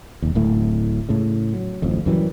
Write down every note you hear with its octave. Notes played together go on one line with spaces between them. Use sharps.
E1 D#2
D1 A2 A3
A2 C#3
F#3
D1 A1 F2
F#2 E3 F#3 G3